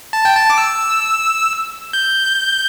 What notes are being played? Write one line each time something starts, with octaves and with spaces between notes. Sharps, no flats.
A5
G5
A5
D6
E6
G6